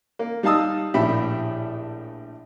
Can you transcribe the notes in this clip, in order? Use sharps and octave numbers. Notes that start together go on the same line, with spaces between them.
A#3
G3 D#4 F5 A5 D#6 E6
A#1 A2 G4 E5 B5